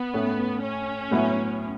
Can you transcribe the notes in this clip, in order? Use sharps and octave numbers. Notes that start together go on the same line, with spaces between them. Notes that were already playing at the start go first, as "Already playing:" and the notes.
Already playing: B3
A2 A3 C#4
C#4
A2 F#3 B3 E4